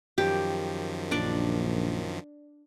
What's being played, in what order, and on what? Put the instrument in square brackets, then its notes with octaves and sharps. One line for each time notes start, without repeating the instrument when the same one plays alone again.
[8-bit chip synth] F#2 D#3 F3 [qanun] G4
[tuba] A#1 [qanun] D4 D5